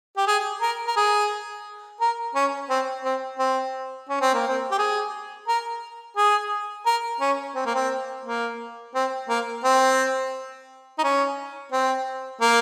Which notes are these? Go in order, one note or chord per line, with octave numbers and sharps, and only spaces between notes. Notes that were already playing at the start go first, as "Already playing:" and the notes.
G4
G#4
A#4
A#4
G#4
A#4
C#4
C4
C4
C4
C#4
C4
A#3
C4
G4
G#4
A#4
G#4
A#4
C#4
C4
A#3
C4
A#3
C4
A#3
C4
D#4
C#4
C4
A#3